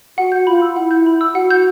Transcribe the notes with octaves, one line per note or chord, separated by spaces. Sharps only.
F#4 F#5
G6
F4 B5
E6
E4 F#5
G6
B5
E6
F#4 F#5
G6